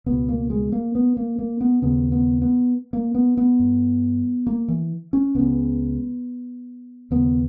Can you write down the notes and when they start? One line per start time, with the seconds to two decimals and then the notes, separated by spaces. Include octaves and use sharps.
0.06 C#2 B2 B3
0.29 A#3
0.50 G#3
0.72 A#3
0.95 B3
1.17 A#3
1.39 A#3
1.61 B3
1.82 D#2 C#3 B3
2.12 B3
2.42 B3
2.93 A#3
3.15 B3
3.37 B3
3.59 G2
4.47 A#3
4.68 E3
5.13 C#4
5.35 C#2 C#3 B3
7.11 D#2 C#3 B3